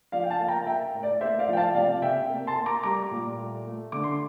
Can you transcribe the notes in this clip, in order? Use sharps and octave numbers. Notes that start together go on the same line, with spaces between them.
F3 D5 F5
G5
F5 A5
A#3
G5 A#5
A#3 E5 G5
A2
D5
A#3 C5 E5
D5 F5
F3 G5
F5 A5
C3 D5 F5
C3 E5 G5
A#3
A5 C6
A#3
A#5 D6
G3 A#5 D6
A#2
A3
A3
D3 D6
C6